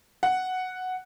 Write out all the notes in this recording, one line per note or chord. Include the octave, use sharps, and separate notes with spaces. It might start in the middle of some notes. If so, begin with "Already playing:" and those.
F#5